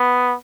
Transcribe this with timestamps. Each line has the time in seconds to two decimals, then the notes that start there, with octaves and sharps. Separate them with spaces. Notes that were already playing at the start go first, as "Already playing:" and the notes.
Already playing: B3